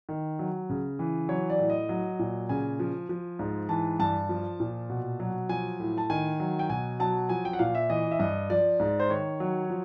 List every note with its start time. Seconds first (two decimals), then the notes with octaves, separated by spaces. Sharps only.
0.09 D#3
0.39 F#3
0.70 C#3
0.99 E3
1.29 F#3 C#5
1.50 D5
1.59 A2
1.70 D#5
1.89 F#3
2.19 A#2
2.49 C#3 G#5
2.79 F3
3.09 F3
3.39 G#2
3.69 E3 A5
3.99 G2 A5
4.29 F3
4.60 A#2
4.89 B2
5.20 F#3
5.49 F3 G#5
5.80 A2
5.98 A5
6.10 D#3 G#5
6.40 F#3
6.59 G5
6.69 B2 G#5
7.00 F#3 A5
7.29 F3 G#5
7.45 G5
7.53 F#5
7.59 A#2 F5
7.75 E5
7.90 E3 D#5
8.12 E5
8.19 G2 D#5
8.50 F3 D5
8.80 G#2
9.00 C5
9.09 D#3 C#5
9.40 F#3
9.69 F3